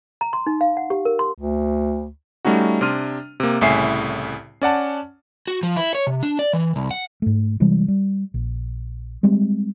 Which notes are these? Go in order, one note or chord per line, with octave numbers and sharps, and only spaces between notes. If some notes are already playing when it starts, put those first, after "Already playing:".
A#5
C6
D#4
F5
F#5
G4
A#4
C6
D2
G3 A3 C#4 D#4 F#4
C3 D4 C6 F6 D#7
C3 A#3
C2 A2 C#3 E5 G#5 C7
C#4 D5 F#5 A5
F#4
F3
E4
C#5
C3
D4
D5
E3
C2
F#5
G#2 A3
C3 E3 G3 G#3
G3
A#1
G3 G#3 C4